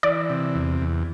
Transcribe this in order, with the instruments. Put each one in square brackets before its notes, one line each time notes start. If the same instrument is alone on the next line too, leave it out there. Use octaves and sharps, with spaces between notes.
[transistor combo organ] E3 [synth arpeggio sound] D5
[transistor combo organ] C3
E2
E2